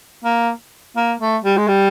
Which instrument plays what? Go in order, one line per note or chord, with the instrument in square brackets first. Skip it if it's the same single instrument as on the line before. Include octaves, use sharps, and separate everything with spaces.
[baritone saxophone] A#3
A#3
A3
G3
G#3
G3